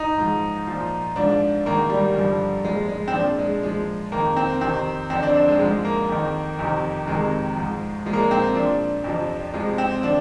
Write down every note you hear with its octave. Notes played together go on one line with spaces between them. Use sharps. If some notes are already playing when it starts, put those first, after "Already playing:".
Already playing: D#4
G#2 F3
A#2 F3
G#2 F3 D4
G#2 D#3 A#3
G3
G2 D3 F3
A#2 F3 G#3
G#3
C4
A#2 F3 D4
G#3
A#2 F3 G#3
F2 D#3 A#3
C4
F2 C3 D#3 C4
F2 D3 F3 C4
D4
D4
G#3
G#2 F3 G#3
A#3
F2 D#3
F2 C3 D#3
F2 C3 D#3 G#3
G#2 F3
A#2 F3 G#3 A#3
G#3
C4
A#2 F3 D4
F2 C3 F3
F2 C3 F3 G#3
C4
D3 F3 D4